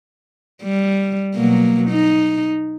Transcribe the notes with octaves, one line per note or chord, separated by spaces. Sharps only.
G3
B2 F#3 A#3
D#4